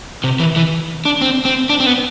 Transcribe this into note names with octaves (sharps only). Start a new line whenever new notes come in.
C3
E3
E3
D4
C4
C4
D4
C4
B3